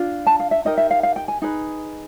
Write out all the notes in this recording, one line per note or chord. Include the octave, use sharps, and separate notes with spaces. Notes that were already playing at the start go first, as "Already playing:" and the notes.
Already playing: D4 F4
A5
F5
E5
D#4 G4 A#4 D#5
E5
F5
F5
G5
G#5
D#4 G#4 B4